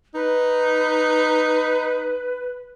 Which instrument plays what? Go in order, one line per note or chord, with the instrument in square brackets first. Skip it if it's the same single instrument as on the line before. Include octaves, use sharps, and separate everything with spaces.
[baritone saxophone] D#4 [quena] B4